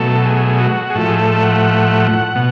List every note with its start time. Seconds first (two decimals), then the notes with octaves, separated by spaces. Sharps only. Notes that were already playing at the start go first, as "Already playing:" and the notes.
Already playing: B2 F#3 A3 A4
0.25 G#4
0.60 F#4
0.90 G#4
0.95 A2 F3 A3 A4
1.08 G#4
1.19 A4
1.42 F#5
2.35 B2